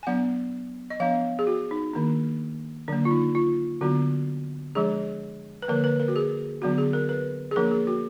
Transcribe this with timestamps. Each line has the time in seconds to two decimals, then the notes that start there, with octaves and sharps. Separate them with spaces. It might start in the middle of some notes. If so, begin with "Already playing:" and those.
0.03 G#5
0.07 F#3 B3 D4 F#5
0.90 D#5
1.00 F3 B3 D4 F5
1.39 G#4
1.47 F#4
1.71 D#4
1.93 D#3 A#3 D4
2.88 D3 F#3 A#3 D4
3.05 F4
3.11 D#4
3.35 F4
3.81 D3 F#3 B3 D4 F#4
4.75 F3 G#3 D4 G#4
5.62 B4
5.68 D3 F3 A#3 A#4
5.84 B4
6.00 A#4
6.08 F#4
6.16 G#4
6.62 D3 F#3 B3 D4 F#4
6.78 G#4
6.93 A#4
7.09 B4
7.51 G#4
7.56 F3 A#3 D4 A#4
7.71 G#4
7.87 F#4